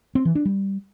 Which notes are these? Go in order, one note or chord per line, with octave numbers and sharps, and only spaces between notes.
C4
E3
D4
G3